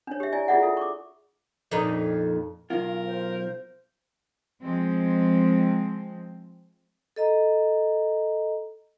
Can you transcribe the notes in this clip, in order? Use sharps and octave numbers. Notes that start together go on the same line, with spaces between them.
D4 C#5
G4 E5
E4 D5 E5 G#5
E4 F4 G#4 D5 E5 F#5
F4 A4 E5
C#6 D6
F2 A#2 D#4
B1 F4 A#4
C5
F3 G#3 C4
A4 D#5 A#5